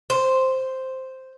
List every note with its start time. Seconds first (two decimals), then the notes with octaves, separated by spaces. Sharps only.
0.10 C5